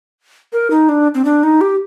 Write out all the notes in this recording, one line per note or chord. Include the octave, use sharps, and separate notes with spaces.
A#4
D#4
D4
C4
D4
D#4
G4